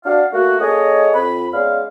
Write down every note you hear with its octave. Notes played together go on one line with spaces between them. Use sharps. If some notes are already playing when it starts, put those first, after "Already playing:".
D4 F#4 F5
A3 A#3 F#4
A#3 C#4 G#4 A4 C#5 D#5
F2 B5
G#3 B3 C#4 D5 F5